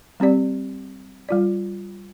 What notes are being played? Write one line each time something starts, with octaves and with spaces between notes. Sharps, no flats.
G3 C4 G4 D5
G3 F4 D5